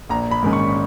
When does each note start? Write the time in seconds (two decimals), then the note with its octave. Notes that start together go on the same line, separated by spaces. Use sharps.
0.09 A#1 A#5
0.31 B5
0.42 G#2 D#3 G#3 C#4
0.53 C#6